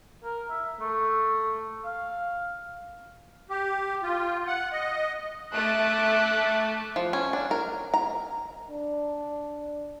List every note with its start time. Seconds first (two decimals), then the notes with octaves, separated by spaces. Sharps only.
0.23 A#4
0.50 E5
0.80 A3
1.84 F5
3.50 G4
4.03 F4
4.47 F#5
4.72 D#5
5.53 A3 D6 F#6
6.96 F3
7.13 C#4
7.33 D4
7.51 A#4
7.94 A#5
8.70 D4